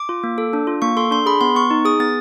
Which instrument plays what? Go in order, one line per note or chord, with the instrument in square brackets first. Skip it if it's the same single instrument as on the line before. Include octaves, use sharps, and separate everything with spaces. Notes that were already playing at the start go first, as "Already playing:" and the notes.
Already playing: [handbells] D6
F4
A#3
A4
D4
F4
A#3 C#6
A4 C6
D4 C6
G#4 B5
B3 C6
B3 C#6
D#4
G#4 D#6
B3 A6